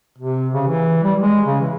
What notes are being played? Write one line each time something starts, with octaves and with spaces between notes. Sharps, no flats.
C3
C#3
E3
G3
G#3
C#3
E3